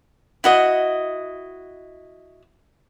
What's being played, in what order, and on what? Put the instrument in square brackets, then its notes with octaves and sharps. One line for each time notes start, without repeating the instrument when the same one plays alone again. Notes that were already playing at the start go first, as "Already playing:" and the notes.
[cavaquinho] E4 F#4 D#5